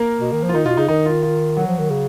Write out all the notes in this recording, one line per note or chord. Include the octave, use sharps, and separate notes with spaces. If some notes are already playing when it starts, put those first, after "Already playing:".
Already playing: A#3 A#4
B2
D#3
F3
F4
D#3 D#4
B2 F4
C#3 D#4
D#3 D#4
F4
F4
F#3 F#4
F3
D#3
C#3